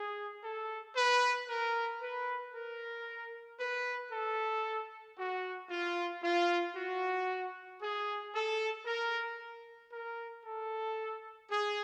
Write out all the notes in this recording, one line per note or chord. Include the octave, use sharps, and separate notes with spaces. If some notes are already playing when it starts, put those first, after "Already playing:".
Already playing: G#4
A4
B4
A#4
B4
A#4
B4
A4
F#4
F4
F4
F#4
G#4
A4
A#4
A#4
A4
G#4